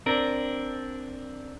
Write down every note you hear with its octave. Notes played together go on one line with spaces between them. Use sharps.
C4 D4 A#4